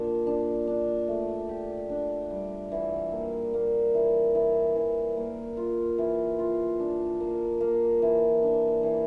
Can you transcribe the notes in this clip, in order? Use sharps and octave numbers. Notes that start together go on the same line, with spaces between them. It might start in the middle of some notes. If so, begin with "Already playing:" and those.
Already playing: A#2 D4
D4
D4
A3
G4
D4
G3
E3
A#3
A#3
E3
E3
E3
A#3
F4
E3
F4
D4
A#3
A#3
E3
D4
E3